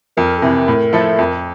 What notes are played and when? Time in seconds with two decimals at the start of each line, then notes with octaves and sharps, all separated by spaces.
0.17 F2 A#4
0.38 A4
0.42 C3 E3 A#4
0.68 A2
0.93 F3 A3 E4 A4
1.19 F2